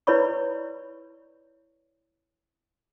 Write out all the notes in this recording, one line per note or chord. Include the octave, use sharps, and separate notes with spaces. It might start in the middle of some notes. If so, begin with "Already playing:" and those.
E4 B4 C#5 D5 B5 C#6